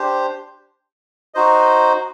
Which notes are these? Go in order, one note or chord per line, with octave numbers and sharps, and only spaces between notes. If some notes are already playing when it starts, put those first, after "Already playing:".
Already playing: D4 G4 C5
D#4 F#4 C5 D#5